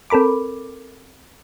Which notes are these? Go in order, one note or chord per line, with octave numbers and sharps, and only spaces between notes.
C4 A4 A#4 B5 D6